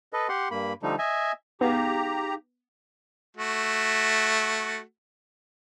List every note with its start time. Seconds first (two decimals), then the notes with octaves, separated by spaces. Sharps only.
0.13 A4 B4 D#5
0.29 G4 F#5 C6
0.51 G2 A#3 B5
0.83 D3 F3 G3 A3 D#4
0.99 D#5 E5 G#5
1.61 B3 D#4 G4 G#4 F5 A#5
3.37 A3 F#4